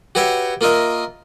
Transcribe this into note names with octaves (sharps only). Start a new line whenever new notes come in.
F#4 G4 B4 C#5 E5 G5
A#3 F4 A#4 D#5 E5